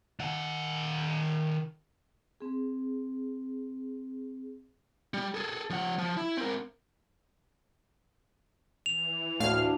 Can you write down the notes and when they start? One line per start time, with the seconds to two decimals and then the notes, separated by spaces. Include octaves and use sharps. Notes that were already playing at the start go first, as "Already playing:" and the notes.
0.20 D#3 F#5
2.41 C4 G#4
5.14 G3
5.34 G#4 A4
5.70 F3 F#5
5.98 F3
6.17 E4
6.37 C4 A#4
8.86 E3 F7
9.40 D2 A2 D4 F5 F6